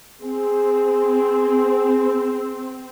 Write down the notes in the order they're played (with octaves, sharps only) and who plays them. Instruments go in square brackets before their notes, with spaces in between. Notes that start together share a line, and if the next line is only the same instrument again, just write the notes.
[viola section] C4 [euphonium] G#4